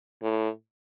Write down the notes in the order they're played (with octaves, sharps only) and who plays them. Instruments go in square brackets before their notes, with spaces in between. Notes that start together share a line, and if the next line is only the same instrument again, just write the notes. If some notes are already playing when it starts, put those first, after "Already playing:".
[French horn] A2